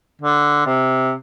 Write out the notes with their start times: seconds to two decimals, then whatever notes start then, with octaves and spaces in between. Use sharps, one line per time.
0.22 D3
0.66 C3